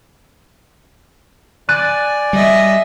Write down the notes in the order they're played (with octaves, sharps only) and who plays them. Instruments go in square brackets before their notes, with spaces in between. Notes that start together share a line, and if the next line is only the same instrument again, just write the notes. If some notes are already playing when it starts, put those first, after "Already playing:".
[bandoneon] D5 G#5 [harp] F#6 A6 D#7
[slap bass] G3 [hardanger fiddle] D#5 E5